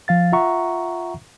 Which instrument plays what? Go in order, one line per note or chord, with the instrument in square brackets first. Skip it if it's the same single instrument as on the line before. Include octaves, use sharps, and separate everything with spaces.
[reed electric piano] F3 F5 A6
F4 E5 F#5 A#5 C#6